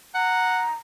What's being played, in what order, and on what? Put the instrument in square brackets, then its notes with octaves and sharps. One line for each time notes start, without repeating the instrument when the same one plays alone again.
[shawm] F#5 [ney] A#5